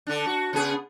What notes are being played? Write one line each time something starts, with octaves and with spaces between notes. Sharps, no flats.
D3 D4
F#4
C#3 B3 G#4